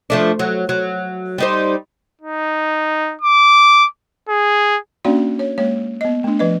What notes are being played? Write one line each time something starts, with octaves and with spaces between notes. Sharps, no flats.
F3 A3 D4
F#3
F#3
G3 D#4 C5
D#4
D6
G#4
A#3 C#4 D4 F#4 D5 F5
C#5
G#3 A#3 C#5
B3 D#5
A3 D4
F3 B4 D#5